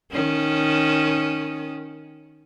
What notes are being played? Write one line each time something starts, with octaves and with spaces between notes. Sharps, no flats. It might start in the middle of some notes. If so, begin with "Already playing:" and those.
D#3 C#4